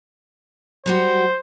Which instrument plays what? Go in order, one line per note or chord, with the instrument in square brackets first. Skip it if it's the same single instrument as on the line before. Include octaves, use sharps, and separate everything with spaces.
[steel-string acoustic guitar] F#3 G3 F#4 [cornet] C5